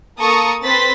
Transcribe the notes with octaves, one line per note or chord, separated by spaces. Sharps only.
A#3 A4 A#5 C#6 D#6 C#7
C4 B4 C5 A6 B6